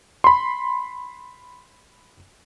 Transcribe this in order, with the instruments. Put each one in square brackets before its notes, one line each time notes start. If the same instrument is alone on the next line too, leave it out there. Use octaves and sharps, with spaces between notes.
[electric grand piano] B5 C6